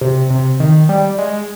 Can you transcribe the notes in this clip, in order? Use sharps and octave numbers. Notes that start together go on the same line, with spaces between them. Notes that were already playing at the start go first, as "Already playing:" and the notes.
C3
C3
D#3
G3
G#3